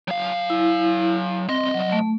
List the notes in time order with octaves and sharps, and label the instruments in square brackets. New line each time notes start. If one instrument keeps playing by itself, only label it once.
[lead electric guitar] F#3 F5
[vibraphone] E4
[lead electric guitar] C2 D#5 [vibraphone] C4
[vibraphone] F#3
A3